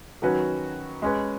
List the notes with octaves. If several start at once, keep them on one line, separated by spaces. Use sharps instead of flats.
D#3 F#3 C#4 F#4 B4
G#3 C#4 B4